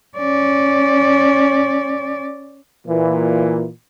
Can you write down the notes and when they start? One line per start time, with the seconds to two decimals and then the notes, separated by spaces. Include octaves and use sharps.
0.18 C#4 D5
2.87 A#2 E3